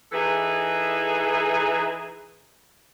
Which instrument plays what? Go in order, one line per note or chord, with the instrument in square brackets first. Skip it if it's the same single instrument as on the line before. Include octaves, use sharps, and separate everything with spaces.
[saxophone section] E3 D#4 G#4 A4 B4 E5